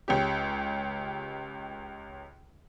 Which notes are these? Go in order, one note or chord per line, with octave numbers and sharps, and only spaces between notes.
C#2 C#4 G4